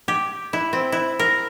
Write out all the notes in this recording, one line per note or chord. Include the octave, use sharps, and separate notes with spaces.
G4
E4
C4
E4
A#4